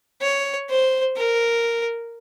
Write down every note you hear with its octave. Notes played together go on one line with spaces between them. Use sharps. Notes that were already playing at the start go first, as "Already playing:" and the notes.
C#5
C5
A#4